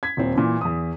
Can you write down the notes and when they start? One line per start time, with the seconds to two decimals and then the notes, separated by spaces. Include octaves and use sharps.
0.03 G#6 B6
0.17 D#1 C4
0.35 A#2 E3
0.61 E2 D#6